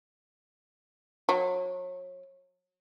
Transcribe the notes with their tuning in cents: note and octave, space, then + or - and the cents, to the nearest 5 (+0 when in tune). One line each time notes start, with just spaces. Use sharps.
F#3 -35